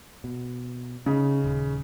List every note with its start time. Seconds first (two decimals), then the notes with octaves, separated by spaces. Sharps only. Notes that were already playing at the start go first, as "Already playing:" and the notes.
0.24 B2
1.06 C#3 C#4 D#4
1.44 D#1